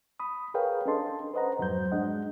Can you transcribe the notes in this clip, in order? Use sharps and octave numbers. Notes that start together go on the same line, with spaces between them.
B5 D#6
G#4 A#4 B4 C#5 F5 G5
C#4 D4 A4 D#5 A5 C6
B4 C5 D#5 F#5 A#5
F2 G#2 F#3 C5 G6
G#3 D4 D#5 F#5